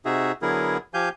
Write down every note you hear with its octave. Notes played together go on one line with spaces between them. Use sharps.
C3 D#4 F#4 G#4 E5
D3 F#3 B3 E4 G#4 A#4
F3 G4 F5 G#5 G6